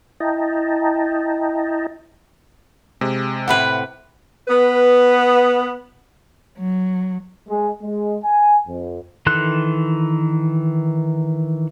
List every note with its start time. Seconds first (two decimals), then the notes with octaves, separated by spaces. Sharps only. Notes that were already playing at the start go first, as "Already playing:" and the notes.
0.20 E4 D#5 G5 A5 A#5
3.01 C3 G#3
3.48 A2 C3 B4 F#5 B5
4.48 B3 B4
6.58 F#3
7.48 G#3
7.83 G#3
8.24 G#5
8.68 F2
9.26 D#3 E3 A4 C6 F#6